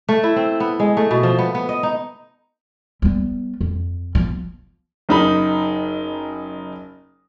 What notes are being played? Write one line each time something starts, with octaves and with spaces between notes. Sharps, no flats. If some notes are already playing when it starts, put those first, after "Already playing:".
A3
E4
C4
B3
G#3
A3
B2
F3
B3
B3
D#5
D#4
G3 B3
F2
F3 B3
F#1 D#4 B5